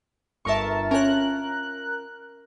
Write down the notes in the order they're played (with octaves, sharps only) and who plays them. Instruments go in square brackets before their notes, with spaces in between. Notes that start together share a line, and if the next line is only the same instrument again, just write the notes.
[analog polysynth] G1 A#4 A5 [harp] E5 C#6
[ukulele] C#4 F4 C#5 [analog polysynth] A#4 F#6